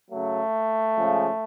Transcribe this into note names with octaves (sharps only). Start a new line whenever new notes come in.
C#3 F#3 A3
C#3 F3 G#3